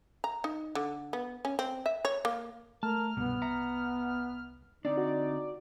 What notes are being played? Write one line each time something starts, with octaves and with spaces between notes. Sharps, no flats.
A#5
D#4
D3
B3
C#4
C4
E5
C#5
A#3
A3 A#4 A5 F6
C2 G2 B2 B3
E5 F#5 A#5
D3 C4 D4 D#4 D5
F#4